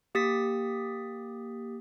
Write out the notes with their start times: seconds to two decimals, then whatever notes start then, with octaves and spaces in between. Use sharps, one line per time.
0.15 A#3 G4 D#6 A6 B6